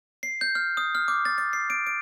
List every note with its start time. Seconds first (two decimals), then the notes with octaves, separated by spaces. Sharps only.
0.23 C7
0.41 G6
0.55 F6
0.77 D#6
0.95 F6
1.08 D6
1.25 A6
1.38 A6
1.53 C7
1.70 D7
1.87 D7